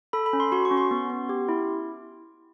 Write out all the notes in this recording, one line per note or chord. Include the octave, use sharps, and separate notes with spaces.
A4 B5
B5
C#4
C6
F#4 C6
C#6
C#4
C6
B3
B3
G4
E4